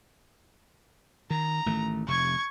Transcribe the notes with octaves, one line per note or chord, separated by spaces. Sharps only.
D#3 A#5
A1 D#3 A3
F1 C3 C#6 G#6